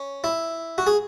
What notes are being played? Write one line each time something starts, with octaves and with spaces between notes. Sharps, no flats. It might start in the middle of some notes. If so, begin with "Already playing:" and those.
Already playing: C#4
E4
F#4
G#4